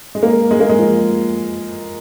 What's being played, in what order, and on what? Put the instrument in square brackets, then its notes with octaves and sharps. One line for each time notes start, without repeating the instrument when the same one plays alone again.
[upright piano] G#3
A#3
G#3
A#3
G#3
F3